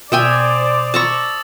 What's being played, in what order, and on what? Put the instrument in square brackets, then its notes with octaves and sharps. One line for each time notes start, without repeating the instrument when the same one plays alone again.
[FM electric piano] B2 [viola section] C5 D5 [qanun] E5 G5 G#5 [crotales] D#6
[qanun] A5 A#5 C#6 [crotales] D6 E6 A6